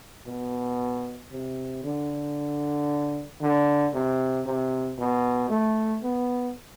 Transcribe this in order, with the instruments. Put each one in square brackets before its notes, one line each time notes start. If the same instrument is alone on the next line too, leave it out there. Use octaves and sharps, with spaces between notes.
[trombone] B2
C3
D3
D3
C3
C3
B2
A3
B3